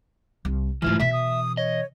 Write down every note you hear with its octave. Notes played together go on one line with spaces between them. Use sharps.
C2
G#2 E3 A3 E4 F4 F6
B2 E3 E5 B6
D#6
C#5 D#5